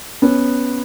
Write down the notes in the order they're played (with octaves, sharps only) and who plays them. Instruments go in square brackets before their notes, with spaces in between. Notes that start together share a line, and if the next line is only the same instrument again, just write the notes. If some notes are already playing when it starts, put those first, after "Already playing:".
[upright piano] B3 [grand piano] C#4